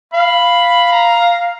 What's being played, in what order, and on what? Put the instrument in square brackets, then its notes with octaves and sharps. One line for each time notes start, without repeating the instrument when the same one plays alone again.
[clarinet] F5 [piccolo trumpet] B5
[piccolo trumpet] A#5